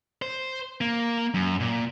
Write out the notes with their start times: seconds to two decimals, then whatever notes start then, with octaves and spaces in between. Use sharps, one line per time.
0.22 C5
0.81 A#3
1.34 F#2
1.60 A#2